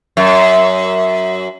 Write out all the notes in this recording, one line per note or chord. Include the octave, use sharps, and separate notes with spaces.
F#2